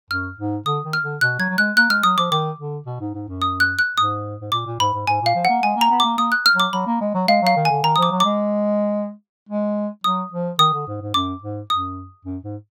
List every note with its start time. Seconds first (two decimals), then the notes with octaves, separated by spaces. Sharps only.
0.10 F#2 F6
0.38 G#2
0.66 D3 D#6
0.84 D#3
0.93 F6
1.03 D3
1.21 B2 F#6
1.39 F#3 G#6
1.49 F#3
1.58 G#3 F#6
1.77 A#3 F#6
1.90 G#3 F6
2.03 F#3 D#6
2.18 F3 D6
2.31 D#3 D6
2.59 D3
2.86 B2
3.00 G#2
3.14 G#2
3.28 F#2
3.42 D#6
3.60 F#6
3.79 F#6
3.97 G#2 D#6
4.41 G#2
4.52 A#2 D6
4.66 A#2
4.80 G#2 B5
4.93 G#2
5.07 G#2 G#5
5.22 A#2 F5
5.35 F3
5.45 A#3 F#5
5.63 G#3 G#5
5.76 A#3
5.81 A#5
5.90 B3
6.00 A#3 D6
6.18 A#3 D#6
6.32 F#6
6.46 F6
6.54 F#3
6.60 D6
6.73 F#3 B5
6.87 A#3
7.01 G#3
7.14 F#3
7.28 G#3 F5
7.42 F#3 F5
7.56 D#3
7.65 D3 G#5
7.83 D#3 A#5
7.96 F3 D#6
8.03 D6
8.11 F#3
8.20 G#3 D6
9.49 G#3
10.04 F#3 D#6
10.32 F3
10.59 D#3 D#6
10.73 D3
10.87 G#2
11.01 G#2
11.14 F#2 D6
11.42 G#2
11.70 F#2 D#6
12.25 F#2
12.43 G#2